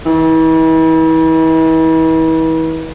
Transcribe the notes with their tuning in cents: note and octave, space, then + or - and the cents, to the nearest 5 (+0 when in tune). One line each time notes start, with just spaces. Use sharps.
E3 -40